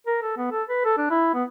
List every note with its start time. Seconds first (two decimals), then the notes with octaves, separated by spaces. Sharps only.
0.07 A#4
0.22 A4
0.37 B3
0.52 A4
0.69 B4
0.85 A4
0.98 D4
1.11 E4
1.34 B3